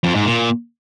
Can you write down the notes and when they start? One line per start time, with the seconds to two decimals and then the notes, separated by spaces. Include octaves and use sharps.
0.04 F2
0.15 G#2
0.26 A#2